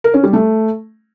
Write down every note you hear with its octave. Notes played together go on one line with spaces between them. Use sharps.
A#4
C#4
G3
A3